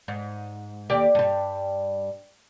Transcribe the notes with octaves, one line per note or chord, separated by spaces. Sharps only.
G#2
D#2 G4 D5
G2 G3